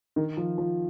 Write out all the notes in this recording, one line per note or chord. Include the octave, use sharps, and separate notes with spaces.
D#3
F3
F3